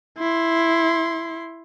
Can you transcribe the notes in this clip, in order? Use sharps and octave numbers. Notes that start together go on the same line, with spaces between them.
E4 C6